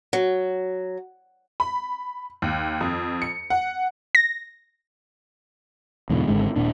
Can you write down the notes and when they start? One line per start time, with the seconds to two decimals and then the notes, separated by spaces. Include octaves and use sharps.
0.13 F#3
1.60 B5
2.42 D#2
2.81 F2
3.22 C#7
3.50 F#5
4.15 A#6
6.10 E2 G#2 B2 D3
6.28 G#1 G#2 D3 G#3
6.56 D#1 A#2 D4